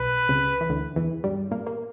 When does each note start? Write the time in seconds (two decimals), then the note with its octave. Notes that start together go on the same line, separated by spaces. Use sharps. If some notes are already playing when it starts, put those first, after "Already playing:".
Already playing: B1 B2 B4
0.29 C#2 C#3
0.61 E3
0.69 D2 D3
0.96 E2 E3
1.24 G2 G3
1.51 A#2 A#3
1.66 A#3